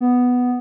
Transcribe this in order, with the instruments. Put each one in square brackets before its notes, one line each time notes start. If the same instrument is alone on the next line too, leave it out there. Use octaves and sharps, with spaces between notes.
[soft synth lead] B3